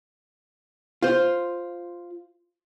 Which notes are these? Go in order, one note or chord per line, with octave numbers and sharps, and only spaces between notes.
F4 C5